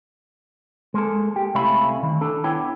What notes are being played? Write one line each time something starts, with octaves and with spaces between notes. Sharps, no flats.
G#3 A#3 A4
G4
C2 A3 C#4 E4 F5 B5
D#3
D4 A4
B3 D4 E4 C#5 G5